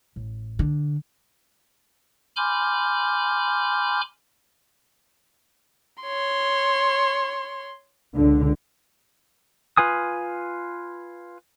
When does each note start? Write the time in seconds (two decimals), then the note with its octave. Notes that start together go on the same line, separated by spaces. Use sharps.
0.16 A1
0.59 D3
2.36 G#5 B5 C6 D6 F6 G6
6.02 C#5 C6
8.14 C#2 D3
9.77 F4 B4 G#5 D#6